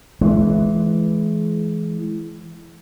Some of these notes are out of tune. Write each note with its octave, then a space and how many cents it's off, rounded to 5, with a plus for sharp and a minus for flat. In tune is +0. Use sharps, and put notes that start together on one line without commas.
E3 +10 G#3 +30